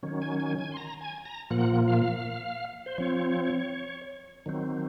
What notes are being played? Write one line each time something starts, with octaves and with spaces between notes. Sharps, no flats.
D#3 F#3 C#4
G#5
G#5
G#5
C6
A#5
G#5
A#5
A#2 F3 A#3 F#5
F5
C5
F3 C4 C#5
D#3 F#3 C4